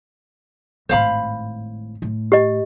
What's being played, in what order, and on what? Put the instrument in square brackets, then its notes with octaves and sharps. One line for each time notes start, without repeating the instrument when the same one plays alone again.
[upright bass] G#1 A2 [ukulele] C5 F5 B5
[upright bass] A2
[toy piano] G4 D#5